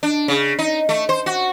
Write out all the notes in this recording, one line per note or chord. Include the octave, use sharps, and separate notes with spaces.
D4
C#3
D#4
A3
C5
F#4